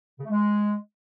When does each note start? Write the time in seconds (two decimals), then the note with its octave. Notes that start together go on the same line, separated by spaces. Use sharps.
0.19 C#3
0.24 A3
0.30 G#3